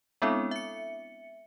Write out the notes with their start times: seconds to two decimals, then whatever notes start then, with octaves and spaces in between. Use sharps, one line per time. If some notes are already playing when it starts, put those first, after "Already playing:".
0.22 G#3 B3 C4 D4 E4 A4
0.51 E5 C#7